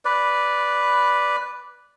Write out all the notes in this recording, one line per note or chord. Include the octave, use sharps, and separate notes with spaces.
B4 D5